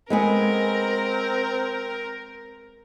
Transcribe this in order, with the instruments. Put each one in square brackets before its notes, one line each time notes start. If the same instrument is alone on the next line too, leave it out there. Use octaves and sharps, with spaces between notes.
[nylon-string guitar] G#3 B3 G#4 [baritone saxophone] C4 [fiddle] A#4